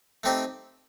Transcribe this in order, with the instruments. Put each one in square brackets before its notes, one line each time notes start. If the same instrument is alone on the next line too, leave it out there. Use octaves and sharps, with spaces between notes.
[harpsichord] A3 C4 D#4 G4